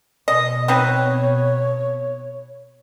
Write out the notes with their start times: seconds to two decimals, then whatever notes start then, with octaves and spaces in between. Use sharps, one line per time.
0.28 B2 D#5
0.68 C4 D#4 B4 C#5